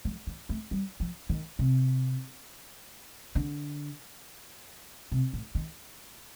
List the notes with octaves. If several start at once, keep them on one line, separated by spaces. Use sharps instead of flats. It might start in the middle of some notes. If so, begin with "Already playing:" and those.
F3
D#3
A3
G3
F3
D#3
C3
D3
C3
A2
D#3